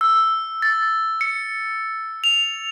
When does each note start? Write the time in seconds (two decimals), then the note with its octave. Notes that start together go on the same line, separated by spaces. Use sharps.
0.01 E6
0.62 A6
1.21 C#7
2.24 F7